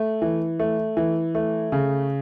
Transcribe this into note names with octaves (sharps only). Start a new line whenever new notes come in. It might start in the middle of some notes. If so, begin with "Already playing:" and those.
Already playing: A3
E3
A3
E3
A3
C#3